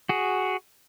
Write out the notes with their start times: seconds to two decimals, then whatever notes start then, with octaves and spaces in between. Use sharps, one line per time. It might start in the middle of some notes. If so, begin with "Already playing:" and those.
0.09 F#4 G#4